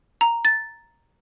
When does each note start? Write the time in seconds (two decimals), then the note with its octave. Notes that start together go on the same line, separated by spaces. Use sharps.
0.21 A#5
0.45 A6